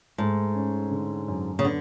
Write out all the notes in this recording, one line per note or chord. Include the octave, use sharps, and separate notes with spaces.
G#2 A3
C#4
D3
F#2
C#3
D3 B3